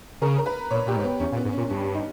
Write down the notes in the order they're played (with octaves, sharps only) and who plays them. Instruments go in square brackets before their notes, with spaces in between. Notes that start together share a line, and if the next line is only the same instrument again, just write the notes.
[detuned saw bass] C#3 [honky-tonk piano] A#4
[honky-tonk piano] A#4
B4
[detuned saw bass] A#2 [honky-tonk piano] C#5
[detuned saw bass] A#2 [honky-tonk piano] G4
[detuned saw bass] G#2
[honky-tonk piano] B3
[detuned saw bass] E2 [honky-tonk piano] C#4
[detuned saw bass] A#2
[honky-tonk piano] B3
[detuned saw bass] G#2
[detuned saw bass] A#2 [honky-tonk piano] C#4
[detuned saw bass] G2 [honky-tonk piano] C#4
[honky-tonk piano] D#4